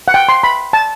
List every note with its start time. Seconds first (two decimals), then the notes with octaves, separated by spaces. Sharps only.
0.08 F#5
0.14 G5
0.29 C6
0.43 B5
0.73 A5